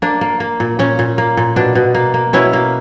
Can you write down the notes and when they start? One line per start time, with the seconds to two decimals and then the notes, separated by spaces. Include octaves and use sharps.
0.02 A#3 D4
0.21 A#3
0.40 A#3
0.60 A#2
0.79 A#2 C#4
0.99 A#2
1.18 A#3
1.37 A#2
1.56 B2 D4
1.75 B2
1.95 A#3
2.14 A#3
2.33 B2 C#4 E4
2.53 A#3